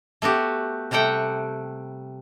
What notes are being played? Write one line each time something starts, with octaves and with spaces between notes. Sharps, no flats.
A3 B3 F#4 G4
C3 G3 A3 F#5 G5